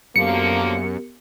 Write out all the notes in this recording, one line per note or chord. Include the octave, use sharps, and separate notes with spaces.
F#2 D3 F3 A#3 B3 G4 A#4 C#7